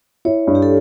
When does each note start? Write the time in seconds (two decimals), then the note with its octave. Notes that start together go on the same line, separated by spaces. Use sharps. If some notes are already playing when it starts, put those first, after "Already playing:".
0.25 E4 C#5
0.47 G2
0.55 G4
0.62 A4